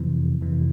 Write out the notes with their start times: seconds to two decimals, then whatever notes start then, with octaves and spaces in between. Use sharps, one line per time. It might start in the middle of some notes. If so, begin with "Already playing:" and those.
Already playing: F2 C3 E3
0.41 F2 C3 E3